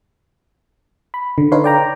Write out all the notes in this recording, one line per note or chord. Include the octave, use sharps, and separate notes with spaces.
B5
D3
D#4 A4 B4 C#5 F5 C6
D5 G5 A#5